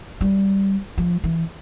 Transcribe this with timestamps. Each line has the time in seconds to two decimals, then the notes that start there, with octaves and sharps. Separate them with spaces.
0.21 G3
0.98 F3
1.24 E3